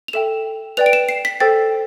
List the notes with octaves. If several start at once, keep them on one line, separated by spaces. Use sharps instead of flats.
F7
A4 E5 G5 E7
B4 D5 G5 F7
D7
E7
C7
B6
A4 C5 G5 A6